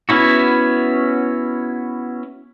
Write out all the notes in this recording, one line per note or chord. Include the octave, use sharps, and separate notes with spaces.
B3 C#4 E4 F#4